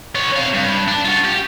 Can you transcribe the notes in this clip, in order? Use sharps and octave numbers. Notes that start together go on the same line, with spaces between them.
B3 C#5
C3 F5
G2
D4
F4 F#4
G4